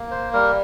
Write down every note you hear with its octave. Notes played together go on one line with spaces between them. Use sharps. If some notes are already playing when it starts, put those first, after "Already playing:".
Already playing: A#3
C5
G3 A#4